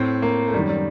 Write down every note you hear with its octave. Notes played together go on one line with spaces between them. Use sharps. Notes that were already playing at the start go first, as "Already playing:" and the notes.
Already playing: A2 C4
A#3
A3
F#2 D#3 G3
G3